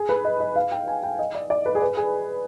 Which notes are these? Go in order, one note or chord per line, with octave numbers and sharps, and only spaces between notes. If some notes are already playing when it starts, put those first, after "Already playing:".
Already playing: G#4
B4
D#5
D#5
F5
G5
G#5
G5
D#5
D5
D5
B4
G#4
B4
G#4